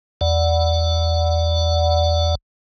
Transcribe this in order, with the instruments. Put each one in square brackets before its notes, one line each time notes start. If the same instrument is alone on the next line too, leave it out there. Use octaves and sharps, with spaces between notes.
[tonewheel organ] E2 D5 F#5